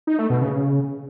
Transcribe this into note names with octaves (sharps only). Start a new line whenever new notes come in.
D#4
A3
B2
C#3